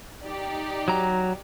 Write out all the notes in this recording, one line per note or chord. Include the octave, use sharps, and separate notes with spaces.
D#4 G4 D5
F#3 A#5